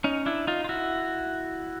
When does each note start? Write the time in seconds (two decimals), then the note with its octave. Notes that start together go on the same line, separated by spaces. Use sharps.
0.04 C#4 D#4
0.26 D4 E4
0.47 D#4 F4
0.64 F4
0.69 E4 F#4